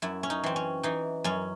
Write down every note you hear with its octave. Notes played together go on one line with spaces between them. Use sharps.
F#2 E4
C#4
D#4
E3 C4
C#4
E3 D#4
F#2 C#4